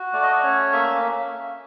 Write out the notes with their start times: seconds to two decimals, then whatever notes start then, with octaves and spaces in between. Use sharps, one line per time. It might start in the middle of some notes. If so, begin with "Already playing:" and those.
Already playing: F#4
0.13 A3 D5
0.23 D#5
0.33 D5
0.43 C#4 C#5
0.72 A#3 E5